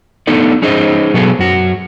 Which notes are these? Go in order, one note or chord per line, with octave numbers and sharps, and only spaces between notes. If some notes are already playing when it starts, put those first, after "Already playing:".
A3 B3 D4 D#4 A4 D5
C#4 D#4 G#4 C5 D#5
B2 F#3 B3 G#4 A4
F#2 F#4